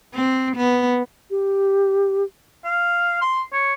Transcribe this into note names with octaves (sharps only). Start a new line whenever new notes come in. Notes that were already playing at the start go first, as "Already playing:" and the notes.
C4
B3
G4
F5
C6
C#5